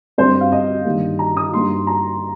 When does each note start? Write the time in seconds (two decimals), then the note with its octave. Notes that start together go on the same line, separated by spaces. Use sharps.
0.18 G2 G3 C4 C5
0.41 F5
0.52 D#5
0.85 G2 D#3 G3 A#3
1.19 A#5
1.37 D#6
1.52 G2 G3 A#3 D#4 C6
1.87 A#5